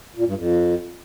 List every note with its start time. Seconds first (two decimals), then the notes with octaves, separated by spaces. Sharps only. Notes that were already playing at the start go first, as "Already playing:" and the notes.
0.16 A#2
0.26 G2
0.37 F2